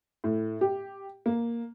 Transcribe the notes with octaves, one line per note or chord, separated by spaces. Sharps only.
A2
G4
A#3